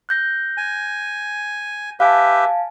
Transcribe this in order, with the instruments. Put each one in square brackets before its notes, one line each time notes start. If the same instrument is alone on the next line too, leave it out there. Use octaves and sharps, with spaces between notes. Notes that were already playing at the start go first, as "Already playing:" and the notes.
[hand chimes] F#6 G6 A#6
[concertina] G#5
[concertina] G4 B4 E5 [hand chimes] F5 G#5 A5